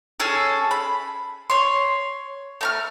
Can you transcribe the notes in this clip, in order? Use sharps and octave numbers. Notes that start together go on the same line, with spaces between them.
C#4 G#4 A4
B5
C#5 C6
A3 A#5 F6